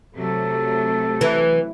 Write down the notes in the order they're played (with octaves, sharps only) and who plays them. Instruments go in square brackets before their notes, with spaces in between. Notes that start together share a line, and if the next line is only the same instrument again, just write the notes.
[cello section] C3 F#3 A3 [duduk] A4
[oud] E3